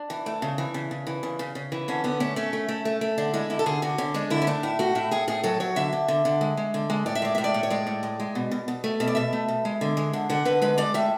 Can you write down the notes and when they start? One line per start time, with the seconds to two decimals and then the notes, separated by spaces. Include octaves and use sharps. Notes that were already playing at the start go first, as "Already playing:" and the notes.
Already playing: D4
0.10 E3
0.26 A3
0.42 C#3
0.58 E3
0.74 C#3
0.91 C#3
1.07 E3
1.23 C#3
1.39 C#3
1.55 C#3
1.72 E3
1.88 D3 C#4
2.04 D3 B3
2.20 A3 C#4
2.36 A3 C#4
2.53 A3
2.68 A3
2.85 A3
3.01 A3
3.18 D3 D4
3.34 G#3 E4
3.50 D3 E4
3.59 A4
3.66 D3 G#4
3.82 D3 F#4
3.98 D3 C#4
4.14 G#3 D4
4.30 D3 E4
4.42 C#4
4.47 A3 D4
4.63 A2 E4
4.79 A3 F#4
4.95 A2 E4
5.11 A2 G#4
5.28 A2 G#4
5.44 F#3 A4
5.60 F#3 C#5
5.76 D3 E5
5.93 D3
6.08 D3
6.25 D3
6.41 G#3
6.57 G#3
6.74 D3
6.90 G#3
7.06 A2 D5
7.15 E5
7.22 G#3 D5
7.35 A2 E5
7.44 D5
7.54 A2
7.63 C#5
7.70 G#3 D5
7.87 A2
8.03 G#3
8.20 G#3
8.35 B2
8.51 B2
8.68 B2
8.84 A3
9.00 B2 E5
9.08 D5
9.15 B2 E5
9.33 A3
9.48 B2
9.65 G#3
9.81 D3
9.97 G#3
10.13 D3
10.29 D3 F#5
10.45 D3 B4
10.62 G#3 B4
10.78 G#3 D5
10.94 A2 E5